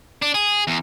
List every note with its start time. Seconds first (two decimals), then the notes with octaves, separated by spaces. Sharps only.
0.22 D4
0.34 G#4
0.67 E2